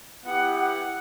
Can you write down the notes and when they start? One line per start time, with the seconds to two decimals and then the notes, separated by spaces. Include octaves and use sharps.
0.24 B3 E4 G4 F#5
0.54 F#5